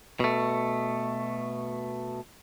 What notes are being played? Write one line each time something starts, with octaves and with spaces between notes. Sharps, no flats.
B2 A3